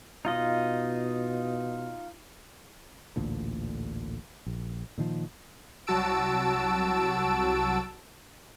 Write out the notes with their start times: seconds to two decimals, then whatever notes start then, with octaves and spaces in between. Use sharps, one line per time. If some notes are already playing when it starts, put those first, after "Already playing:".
0.25 B2 D#4 F4 D#5
3.16 A1 D2 A#2 D3
4.46 A#1
4.98 A#2 D#3 F3
5.87 C2 F#3 F#4 A5 E6 D7